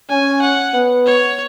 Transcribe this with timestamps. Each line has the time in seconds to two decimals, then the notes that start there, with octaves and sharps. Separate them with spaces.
0.09 C#4 G#5
0.42 F#5
0.74 B3
1.06 C#5